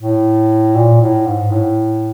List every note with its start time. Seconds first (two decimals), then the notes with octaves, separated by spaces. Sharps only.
0.01 A2
0.76 A#2
1.01 A2
1.26 G#2
1.51 A2